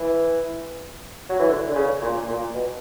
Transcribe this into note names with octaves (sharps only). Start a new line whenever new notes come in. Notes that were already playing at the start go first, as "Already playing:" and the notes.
Already playing: E3
F#3
E3
D3
D3
C#3
A#2
A#2
B2